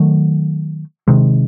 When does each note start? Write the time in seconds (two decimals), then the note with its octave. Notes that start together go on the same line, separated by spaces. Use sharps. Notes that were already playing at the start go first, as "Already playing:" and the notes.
Already playing: D#3 F#3 A3
1.08 C3 D#3 G#3